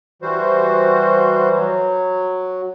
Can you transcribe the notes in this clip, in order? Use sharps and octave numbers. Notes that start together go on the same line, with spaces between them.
E3 G3 F#4 C5
F#3